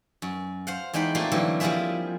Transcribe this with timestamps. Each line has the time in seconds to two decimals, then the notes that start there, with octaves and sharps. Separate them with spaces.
0.22 F#2
0.67 C5 F5 F#5
0.93 E2 G#3 D#4 G5 B5
1.15 A3 A#3 C4 F4 G4 D5
1.32 D3 E3 F#3 G3 A#3
1.60 F3 G3 E4 F4 G#4 E5